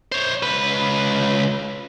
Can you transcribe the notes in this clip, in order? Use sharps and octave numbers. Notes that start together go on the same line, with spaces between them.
C5 C#5
C#2 B4